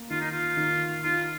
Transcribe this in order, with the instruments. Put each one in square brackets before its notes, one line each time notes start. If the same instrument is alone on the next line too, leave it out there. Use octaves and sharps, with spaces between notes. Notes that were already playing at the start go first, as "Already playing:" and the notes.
Already playing: [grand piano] A#3
[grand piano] D#3 [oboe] F4
[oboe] D#4
F4
[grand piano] D#3
[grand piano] D#4 [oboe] F4